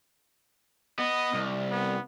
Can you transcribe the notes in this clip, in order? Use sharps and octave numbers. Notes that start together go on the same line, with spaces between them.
B3 D#5
C2
B3